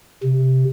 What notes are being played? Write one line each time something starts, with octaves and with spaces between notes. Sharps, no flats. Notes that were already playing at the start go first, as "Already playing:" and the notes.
C3